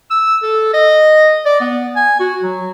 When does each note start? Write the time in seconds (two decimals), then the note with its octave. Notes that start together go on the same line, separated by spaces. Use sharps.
0.11 E6
0.43 A4
0.74 D#5
1.46 D5
1.61 B3
1.96 G#5
2.20 F#4
2.43 F#3